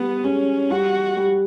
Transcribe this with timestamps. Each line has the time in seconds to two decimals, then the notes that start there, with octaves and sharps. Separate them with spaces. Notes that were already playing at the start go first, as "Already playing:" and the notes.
Already playing: G3 B3
0.24 G#3 C#4
0.70 G3 F#4
1.17 G3